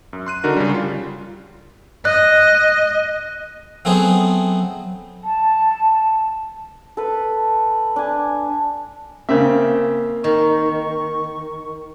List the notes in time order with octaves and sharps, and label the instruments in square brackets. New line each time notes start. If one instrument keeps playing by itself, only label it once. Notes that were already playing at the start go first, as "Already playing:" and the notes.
[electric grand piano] F#2
C6 F#6 D#7
D3 D4 D#4 F#4 A#4
C#3 G3
G3 F4
[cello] D#5 [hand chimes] F#6
[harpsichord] F#3 A3 B3 C4 G#4
[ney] A5
[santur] A4 B4
D4 G#5
[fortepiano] C#3 C4 E5 [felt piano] A#3
[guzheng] D#3 [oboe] C#6